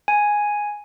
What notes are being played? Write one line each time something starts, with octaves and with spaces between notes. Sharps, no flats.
G#5